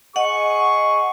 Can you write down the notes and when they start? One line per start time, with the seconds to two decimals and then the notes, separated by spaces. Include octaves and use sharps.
0.16 G#4 D#5 F#5 C#6